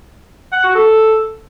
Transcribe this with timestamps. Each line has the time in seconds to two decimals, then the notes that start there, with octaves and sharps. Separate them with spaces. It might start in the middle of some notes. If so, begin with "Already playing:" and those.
0.53 F#5
0.64 F#4
0.75 A4